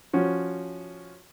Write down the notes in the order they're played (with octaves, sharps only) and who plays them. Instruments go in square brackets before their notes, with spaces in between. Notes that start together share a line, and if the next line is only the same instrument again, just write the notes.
[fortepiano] F3 C#4 F#4